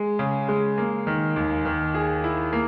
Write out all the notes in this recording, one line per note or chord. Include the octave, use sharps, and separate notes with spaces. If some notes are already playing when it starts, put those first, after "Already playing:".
Already playing: G#3
C#3
G#3
A#3
D#3
D#2
D#3
G#4
E4
A#3